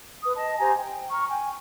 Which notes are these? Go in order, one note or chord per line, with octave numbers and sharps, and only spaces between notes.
B4 D#6
D#5 A5
G4 C5 G#5 A#5
G5
A#5 C#6 F6
G5 G#5